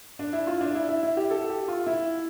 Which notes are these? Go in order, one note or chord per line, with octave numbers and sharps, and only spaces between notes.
D4
E4
F4
D4
E4
E4
E4
G4
A4
G4
F4
E4